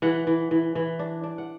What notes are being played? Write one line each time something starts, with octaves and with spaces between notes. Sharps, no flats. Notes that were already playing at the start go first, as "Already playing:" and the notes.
E3 F#5
E3
E3
E3
D4
D4
F#5